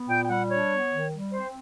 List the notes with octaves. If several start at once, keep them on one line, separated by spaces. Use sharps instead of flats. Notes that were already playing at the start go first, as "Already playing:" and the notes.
Already playing: B3
A#2 G5
G5
G3 F#5
D4 C#5
B3
D#3
G3
C4 C5